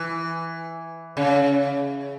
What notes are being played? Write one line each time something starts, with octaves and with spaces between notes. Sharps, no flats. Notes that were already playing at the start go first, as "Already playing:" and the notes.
Already playing: E3
C#3